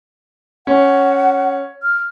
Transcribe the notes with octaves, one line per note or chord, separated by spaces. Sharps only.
C#4 F#5
F6